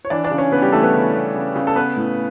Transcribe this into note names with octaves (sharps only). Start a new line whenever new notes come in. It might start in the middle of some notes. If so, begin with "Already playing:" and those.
C#5
E3 D4 D5
D4 D5
C#3
C#4 C#5
C#3 B3 B4
G3 G4
E3 A3 A4
B3 B4
C#3
B3
C#3
C#3
A4
B3 B4
A2